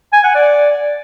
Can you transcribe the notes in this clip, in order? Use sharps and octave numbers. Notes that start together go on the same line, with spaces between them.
G#5
F#5
D5